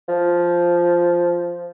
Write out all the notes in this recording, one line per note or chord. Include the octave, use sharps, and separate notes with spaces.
F3